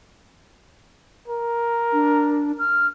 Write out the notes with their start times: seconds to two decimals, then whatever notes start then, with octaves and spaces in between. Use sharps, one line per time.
1.28 A#4
1.93 D4
2.59 F6